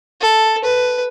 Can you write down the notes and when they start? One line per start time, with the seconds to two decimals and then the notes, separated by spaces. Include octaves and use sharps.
0.20 A4
0.64 B4